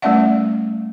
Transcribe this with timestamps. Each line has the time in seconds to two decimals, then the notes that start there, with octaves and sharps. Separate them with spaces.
0.02 G3 A3 C#4 D5 E5 F#5